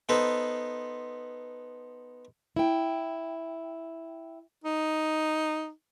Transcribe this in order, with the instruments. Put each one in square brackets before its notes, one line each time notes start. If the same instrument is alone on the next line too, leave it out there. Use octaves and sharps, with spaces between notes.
[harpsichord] B3 D#4 A4 B4 C5
[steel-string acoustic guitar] E4 G5
[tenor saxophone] D#4